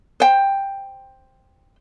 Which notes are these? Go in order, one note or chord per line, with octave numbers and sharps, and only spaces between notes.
C5 G5